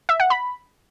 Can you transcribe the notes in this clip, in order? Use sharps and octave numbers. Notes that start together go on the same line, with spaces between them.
E5
F#5
B5